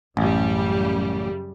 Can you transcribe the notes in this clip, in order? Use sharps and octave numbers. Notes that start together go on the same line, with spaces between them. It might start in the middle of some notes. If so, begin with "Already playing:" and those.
A1 F#2 C#3 G3